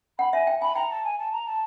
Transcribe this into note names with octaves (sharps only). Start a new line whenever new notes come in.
F#5 B5
E5 G#5
G5
G#5 B5
G5 A#5
A5
G#5
A5
A#5
A5